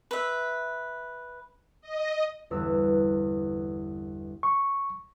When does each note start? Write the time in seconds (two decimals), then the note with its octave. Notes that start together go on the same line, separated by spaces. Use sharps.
0.11 B4 E5
1.82 D#5
2.50 G1 E2 E6
4.43 C#6